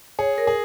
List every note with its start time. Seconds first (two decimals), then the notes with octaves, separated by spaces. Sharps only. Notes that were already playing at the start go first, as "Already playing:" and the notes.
0.19 G#4 C#5
0.38 A#4
0.47 G#4